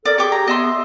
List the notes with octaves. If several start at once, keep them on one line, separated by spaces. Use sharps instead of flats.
A4 A#4 D5
G4 G#4 C#5 G5 D6
A#5
B3 D#5 E5 C6